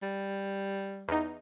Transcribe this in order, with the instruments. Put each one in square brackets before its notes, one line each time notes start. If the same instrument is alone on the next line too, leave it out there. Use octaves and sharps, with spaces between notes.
[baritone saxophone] G3
[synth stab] E2 D#4